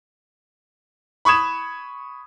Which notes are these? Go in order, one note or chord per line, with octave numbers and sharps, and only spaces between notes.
B5 C#6 D#6 G#6 E7